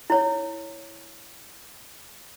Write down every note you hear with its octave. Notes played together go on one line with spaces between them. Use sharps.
E4 C#5